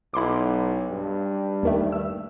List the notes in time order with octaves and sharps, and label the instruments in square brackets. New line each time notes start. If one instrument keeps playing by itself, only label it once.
[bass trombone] B1 [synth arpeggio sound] E4 C6 D6
[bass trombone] G2
[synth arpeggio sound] D#2 D#3 A3
E6